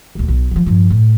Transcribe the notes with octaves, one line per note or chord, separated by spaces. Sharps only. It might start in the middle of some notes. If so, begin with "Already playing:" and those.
D#1 D2
B1
E3 F3
G2 F3
A2